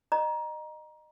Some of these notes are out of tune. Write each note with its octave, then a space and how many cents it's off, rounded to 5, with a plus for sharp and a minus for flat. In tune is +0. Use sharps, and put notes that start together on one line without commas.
D#5 -25 A#5 +20